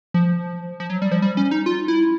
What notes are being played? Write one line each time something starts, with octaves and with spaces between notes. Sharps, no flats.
F3
F3
F#3
G3
F3
G3
C#4
D#4
F4
E4